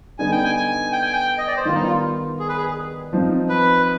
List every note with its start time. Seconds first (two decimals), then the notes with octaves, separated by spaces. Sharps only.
0.19 D3 G3 B3 D#4 G#5
0.32 G5
0.44 G#5
0.55 G#5
0.92 G5
1.02 G#5
1.13 G5
1.38 D#5
1.48 D5
1.57 C5
1.65 D#3 G3 B3 F4
1.75 D#4
1.84 F4
2.39 G#4
2.49 B4
2.57 G#4
3.13 F3 C4 D#4
3.49 B4